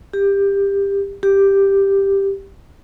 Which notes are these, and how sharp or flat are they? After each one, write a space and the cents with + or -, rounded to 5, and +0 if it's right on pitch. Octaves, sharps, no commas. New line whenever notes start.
G4 +20
G4 +5